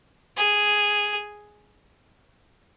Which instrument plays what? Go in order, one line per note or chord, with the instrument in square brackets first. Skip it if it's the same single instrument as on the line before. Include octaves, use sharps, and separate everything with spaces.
[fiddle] G#4